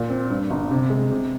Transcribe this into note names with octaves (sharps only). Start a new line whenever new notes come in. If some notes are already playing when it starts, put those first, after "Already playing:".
Already playing: A#2
C4
G2
G1
C3
G#3
C3